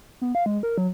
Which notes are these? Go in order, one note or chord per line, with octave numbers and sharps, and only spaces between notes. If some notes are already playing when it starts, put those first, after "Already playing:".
B3
F5
G#3
A#4
F#3